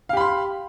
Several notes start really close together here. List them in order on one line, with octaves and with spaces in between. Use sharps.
F5 G4 B5 C6